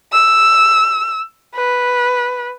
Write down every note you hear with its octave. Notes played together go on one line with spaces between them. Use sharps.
E6
B4